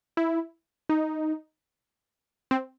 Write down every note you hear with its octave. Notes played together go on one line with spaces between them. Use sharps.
E4
D#4
C4